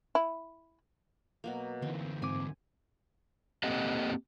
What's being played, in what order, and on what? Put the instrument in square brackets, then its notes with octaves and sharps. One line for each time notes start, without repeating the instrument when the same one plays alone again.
[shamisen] E4
[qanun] B2 F#3 A#3
[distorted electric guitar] D2 E3 [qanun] C4
[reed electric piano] G#2 C4 D6 [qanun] G#5
[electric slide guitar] A#3 C4 G4 A4 D#5 F#5